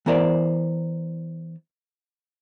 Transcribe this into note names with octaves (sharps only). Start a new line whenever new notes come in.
E3 B3 E4 A#4 C5 D5